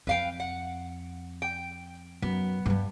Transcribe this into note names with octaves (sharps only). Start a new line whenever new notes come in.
F2 B4 F5 G5
F#5
G5
F#2 B3
G2 G3